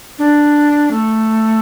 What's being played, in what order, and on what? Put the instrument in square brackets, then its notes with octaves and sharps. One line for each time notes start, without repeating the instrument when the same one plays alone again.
[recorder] D4
A3